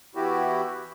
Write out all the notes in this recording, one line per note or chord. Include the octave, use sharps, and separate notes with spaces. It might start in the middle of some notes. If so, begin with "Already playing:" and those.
E3 B3 E4 F#4 G4